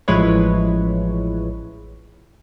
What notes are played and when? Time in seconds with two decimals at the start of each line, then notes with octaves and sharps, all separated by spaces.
0.08 A1 F3 G#3 E4 B4 C#5